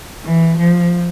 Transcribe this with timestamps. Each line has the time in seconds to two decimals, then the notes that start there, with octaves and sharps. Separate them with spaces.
0.22 E3
0.56 F3